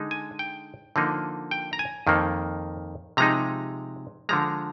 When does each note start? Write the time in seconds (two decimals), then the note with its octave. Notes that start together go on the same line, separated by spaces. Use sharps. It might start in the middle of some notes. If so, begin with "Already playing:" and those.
Already playing: D3 G#3 D#4
0.11 G#5
0.39 G5
0.96 D3 F3 A#3 D#4
1.51 G5
1.73 A#5
1.79 G#5
2.07 F2 D#3 A#3
3.17 C3 F3 G#3 D#4 A#5
4.29 D3 F3 G#3 A#5